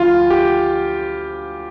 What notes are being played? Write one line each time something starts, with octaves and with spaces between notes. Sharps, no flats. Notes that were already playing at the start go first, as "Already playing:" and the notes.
Already playing: D2 F3 F4
G4